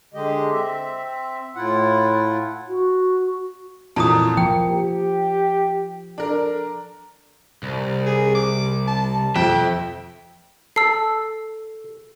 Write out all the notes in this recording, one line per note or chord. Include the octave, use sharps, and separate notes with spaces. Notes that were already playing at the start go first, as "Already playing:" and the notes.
D3 G#3 G4 D#5
C4 E5
A2 E4 F4 F#5
F#4
F2 A#2 E3 A5 A#5 D#6
F3 A#3 G5 C#7
G4
D4 A4 A#4
C2
G#4
D6
A5
F2 E5 G5
A4 E6 C7